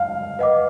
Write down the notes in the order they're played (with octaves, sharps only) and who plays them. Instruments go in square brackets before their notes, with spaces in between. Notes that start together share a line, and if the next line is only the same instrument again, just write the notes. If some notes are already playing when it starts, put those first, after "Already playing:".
Already playing: [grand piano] F5
[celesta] B4 D#5 F#5 D6